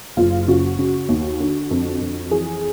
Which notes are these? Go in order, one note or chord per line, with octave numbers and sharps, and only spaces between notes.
F#1 F4
C#3 F#4
C#3
D#2
D3
F2
F2
E3 G#4